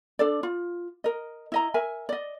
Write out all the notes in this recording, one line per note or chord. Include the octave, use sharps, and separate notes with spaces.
D4 A4 D5
F4
A#4 D#5
E4 D#5 A#5
A#4 E5 G#5
D5 D#5